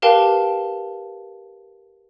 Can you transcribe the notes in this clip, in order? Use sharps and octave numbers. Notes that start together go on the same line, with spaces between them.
G4 A#4 B4 F5 G5 A5